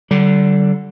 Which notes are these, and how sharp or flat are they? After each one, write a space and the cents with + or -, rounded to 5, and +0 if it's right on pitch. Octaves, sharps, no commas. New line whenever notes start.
D3 +0 G3 -40